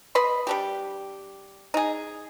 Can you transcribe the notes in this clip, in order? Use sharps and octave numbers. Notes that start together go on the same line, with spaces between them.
B4 D#5 B5 C6
G3 D4 G4
D#4 G#4